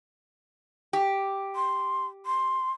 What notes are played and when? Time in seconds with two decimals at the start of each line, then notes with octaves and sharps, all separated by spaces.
0.93 G4
1.56 C6
2.26 C6